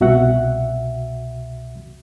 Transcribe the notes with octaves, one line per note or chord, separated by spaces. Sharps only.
C2 B2 F#4 E5 F#5